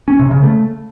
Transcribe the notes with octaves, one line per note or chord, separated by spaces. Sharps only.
C#4
C3
C#3
A3